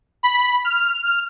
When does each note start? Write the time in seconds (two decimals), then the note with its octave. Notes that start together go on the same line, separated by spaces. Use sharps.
0.23 B5
0.65 F6